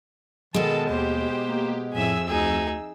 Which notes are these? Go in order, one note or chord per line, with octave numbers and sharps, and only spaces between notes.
B2 D#3 G#3 A4 A5
D#2 G4 C5
A#3
F2 A2 G#4 E5 E6
D2 D#4 G#4